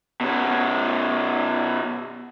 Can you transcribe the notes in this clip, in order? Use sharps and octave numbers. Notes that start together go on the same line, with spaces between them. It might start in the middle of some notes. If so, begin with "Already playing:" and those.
B2 C#4